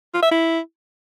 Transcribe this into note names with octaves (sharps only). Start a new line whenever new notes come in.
F4
E5
E4